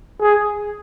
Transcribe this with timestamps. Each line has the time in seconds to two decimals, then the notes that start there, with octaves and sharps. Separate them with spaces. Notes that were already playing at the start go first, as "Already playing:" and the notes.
0.21 G#4